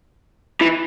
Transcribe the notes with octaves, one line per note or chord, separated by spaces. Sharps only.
E3